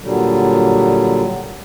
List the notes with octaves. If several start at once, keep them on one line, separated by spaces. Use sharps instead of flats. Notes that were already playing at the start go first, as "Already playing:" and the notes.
A#2 D3 F#3 G3